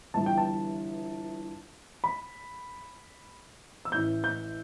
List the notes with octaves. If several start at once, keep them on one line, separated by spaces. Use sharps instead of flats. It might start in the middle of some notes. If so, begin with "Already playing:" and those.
G1 G2 E3 A5
G5
A5
B5
E6
A1 A2 E3 G6
G6